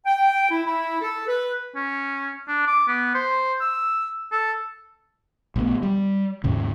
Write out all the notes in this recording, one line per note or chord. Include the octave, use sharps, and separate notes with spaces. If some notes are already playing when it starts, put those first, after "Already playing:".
G5
E4
E4
A4
B4
C#4
D4
D6
B3
C5
E6
A4
A#1 A3 B3
G3
D#2 G#2 C#3